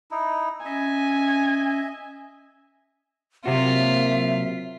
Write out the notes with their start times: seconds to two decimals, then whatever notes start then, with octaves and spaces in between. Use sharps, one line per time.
0.11 D#4 E4
0.65 C#4 D#5 E5 G#5
3.46 C3 F#3 A#3 C4 F4 F#4 E5